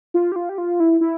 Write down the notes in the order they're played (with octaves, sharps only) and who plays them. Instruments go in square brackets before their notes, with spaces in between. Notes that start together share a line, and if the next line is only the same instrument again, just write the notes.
[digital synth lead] F4
G4
F4
G4
F4
E4
E4